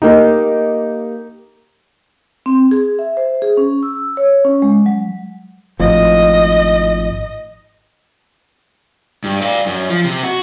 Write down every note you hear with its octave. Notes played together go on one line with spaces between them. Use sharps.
A#3 D#4 G4
C4
G#4
E5
C5
G#4
C#4
E6
C#5
C#4
G#3
F#3
G#1 A2 F3 D#5
G2
D5 F5
F#2
F3
C3
F#4